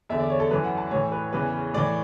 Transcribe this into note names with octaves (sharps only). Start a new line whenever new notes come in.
E2 D3 E5
D5
C#5
A4
F#2 E3 B4
F#5
A5
A2 E3 C#5
B4
E2 C#3 E3 B4
A2 E3 D5